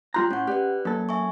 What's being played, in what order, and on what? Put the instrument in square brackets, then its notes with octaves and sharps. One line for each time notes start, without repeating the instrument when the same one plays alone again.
[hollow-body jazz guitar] G3 F4 A#5 [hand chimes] C6 F#6 G6
[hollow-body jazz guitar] A2 [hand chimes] C#4 F#5
[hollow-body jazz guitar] G4 [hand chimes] B4 D5 F#6
[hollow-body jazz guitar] F#2 A4 [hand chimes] A#3
[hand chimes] E5 G#5 C#6